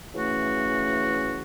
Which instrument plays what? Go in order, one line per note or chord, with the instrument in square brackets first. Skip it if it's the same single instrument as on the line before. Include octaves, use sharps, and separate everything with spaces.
[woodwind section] C#3 E3 A3 C#4 F#4